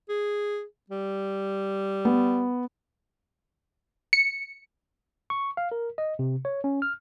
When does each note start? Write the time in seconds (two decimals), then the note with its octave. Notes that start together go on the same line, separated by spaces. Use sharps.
0.09 G#4
0.90 G3
2.05 B3
4.13 C#7
5.30 C#6
5.57 F5
5.72 A#4
5.98 D#5
6.19 C3
6.45 C#5
6.64 C#4
6.82 F6